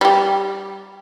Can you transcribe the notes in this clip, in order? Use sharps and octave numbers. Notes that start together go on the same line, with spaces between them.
G3 G4